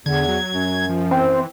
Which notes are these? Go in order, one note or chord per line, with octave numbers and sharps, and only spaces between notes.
E2 D3 G#6
F#3
F#2
F3
E3 C4